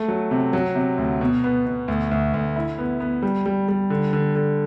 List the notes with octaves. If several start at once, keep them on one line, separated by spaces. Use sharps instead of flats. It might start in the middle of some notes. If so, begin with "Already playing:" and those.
Already playing: A3
F#3
C3
F#3
C3
D2
B2
B3
B2
D2
D2
D2
E4
B3
B3
G3
G3
G3
D3
D3
D3